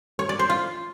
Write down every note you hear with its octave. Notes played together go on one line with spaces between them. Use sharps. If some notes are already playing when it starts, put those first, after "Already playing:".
C#5
D5
C5
F4